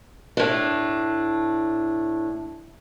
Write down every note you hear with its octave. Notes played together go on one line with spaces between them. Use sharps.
A2 D4